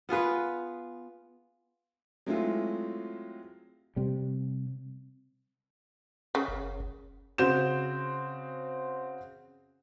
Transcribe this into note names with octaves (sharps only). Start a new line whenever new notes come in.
B3 F4 G#4 B4
F#3 G#3 A3 C4 E4 F4
C3 G3
C#3
F#1
C#3 C4 F#4 G6 E7